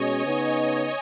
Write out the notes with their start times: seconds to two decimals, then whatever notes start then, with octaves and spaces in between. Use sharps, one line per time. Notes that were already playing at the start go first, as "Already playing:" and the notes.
Already playing: B2 G#3 C#4 C#5 D#5 G#5
0.25 C#3 B3 D#4